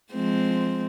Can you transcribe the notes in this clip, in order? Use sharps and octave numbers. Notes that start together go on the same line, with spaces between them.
F3 G#3 C4